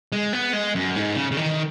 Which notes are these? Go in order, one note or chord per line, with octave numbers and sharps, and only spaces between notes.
G#3
B3
G#3
F#2
G#2
C#3
C#3
D#3